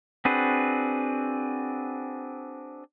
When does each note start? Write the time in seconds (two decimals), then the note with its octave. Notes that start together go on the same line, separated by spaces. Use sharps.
0.25 C4 D4 F#4 G#4 B4